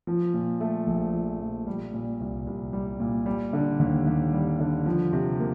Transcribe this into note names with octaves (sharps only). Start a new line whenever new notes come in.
F3
A#2
A3
A#1
F3
A#2
G3
A#2
C2
C2
G3
A#2
G3
D3
D#2
D#2
G3
D3
F3
C3
A#3